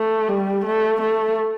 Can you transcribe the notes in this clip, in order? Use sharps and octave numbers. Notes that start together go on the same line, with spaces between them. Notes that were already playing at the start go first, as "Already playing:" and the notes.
Already playing: A3
G3
A3
A3